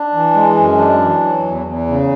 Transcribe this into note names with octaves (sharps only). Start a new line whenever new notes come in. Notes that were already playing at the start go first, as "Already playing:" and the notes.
Already playing: D4
E3
G#3
F#2
D4
E3
F#3
E2
E2
C#3